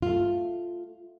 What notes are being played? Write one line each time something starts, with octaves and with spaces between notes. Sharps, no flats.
A3 F4